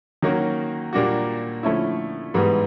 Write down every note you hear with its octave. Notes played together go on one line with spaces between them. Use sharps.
D#3 F#3 A#3 C#4 F#4
A#2 G3 A#3 D4 F#4
D3 F3 A3 C#4 E4
G#2 E3 G3 B3